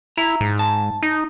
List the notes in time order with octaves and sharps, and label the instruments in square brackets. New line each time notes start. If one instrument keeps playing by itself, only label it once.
[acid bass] E4 [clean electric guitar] A#5
[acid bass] G#2
[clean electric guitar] A5
[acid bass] D#4